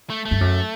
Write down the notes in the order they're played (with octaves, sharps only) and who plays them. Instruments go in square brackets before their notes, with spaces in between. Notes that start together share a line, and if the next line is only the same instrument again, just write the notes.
[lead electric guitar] A3
A3
[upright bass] G2
F#2